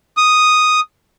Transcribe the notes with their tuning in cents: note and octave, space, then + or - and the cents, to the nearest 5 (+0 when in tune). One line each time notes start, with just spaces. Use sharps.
D#6 +0